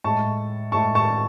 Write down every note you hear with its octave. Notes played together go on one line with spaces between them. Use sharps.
A2 G#3 A5 C#6
A2 G#3 A5 C#6
A5 C#6